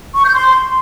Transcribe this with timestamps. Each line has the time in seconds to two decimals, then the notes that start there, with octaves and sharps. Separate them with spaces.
0.15 C#6
0.25 G6
0.34 C6